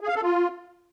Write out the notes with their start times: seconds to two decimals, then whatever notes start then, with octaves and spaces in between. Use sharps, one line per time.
0.01 G#4
0.08 F5
0.15 A4
0.22 F4